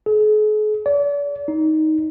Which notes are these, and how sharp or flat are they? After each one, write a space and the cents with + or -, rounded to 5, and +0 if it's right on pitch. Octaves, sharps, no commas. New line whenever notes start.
G#4 +45
D5 -40
D#4 +10